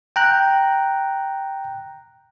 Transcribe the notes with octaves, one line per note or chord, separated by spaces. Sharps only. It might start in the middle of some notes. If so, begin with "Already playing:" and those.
G5 A#5 F#6